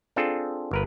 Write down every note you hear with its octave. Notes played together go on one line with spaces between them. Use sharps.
C4 D4 F4 G#4 A4
G1 A#4 B4